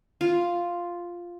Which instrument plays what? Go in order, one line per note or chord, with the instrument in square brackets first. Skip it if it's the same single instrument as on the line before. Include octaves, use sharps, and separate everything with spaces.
[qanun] F4